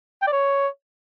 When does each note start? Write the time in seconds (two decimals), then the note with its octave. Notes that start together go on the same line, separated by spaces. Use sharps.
0.22 G5
0.27 D5
0.32 C#5